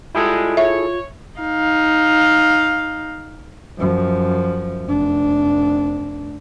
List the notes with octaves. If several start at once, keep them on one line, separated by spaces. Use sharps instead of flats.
G3 G#3 E4 F4 G#4 A4
C#5 E5
D#4 F5
F#2 F3
F1 D4